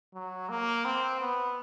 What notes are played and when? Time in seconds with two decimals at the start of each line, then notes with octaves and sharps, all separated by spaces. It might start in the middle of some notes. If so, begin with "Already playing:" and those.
0.14 F#3
0.49 A#3
0.85 C4
1.21 B3